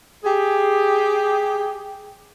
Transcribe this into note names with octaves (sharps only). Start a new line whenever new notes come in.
G4 G#4